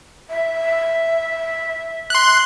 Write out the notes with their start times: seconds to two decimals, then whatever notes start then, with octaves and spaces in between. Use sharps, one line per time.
0.30 E5
2.10 C6 F#6